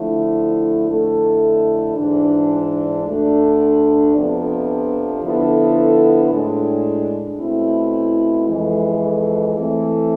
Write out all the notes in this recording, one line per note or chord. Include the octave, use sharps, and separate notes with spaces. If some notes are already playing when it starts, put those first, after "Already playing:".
Already playing: D3 F3 A3 E4
F2 D3 A3 E4 A4
G#2 E3 G#3 D4
D2 D3 A3 D4
F2 C3 F3 B3 D4
D3 F3 B3 E4 A4
A2 G#3 D4
B2 A3 C4 E4
F2 E3 G#3
E3 A3 C4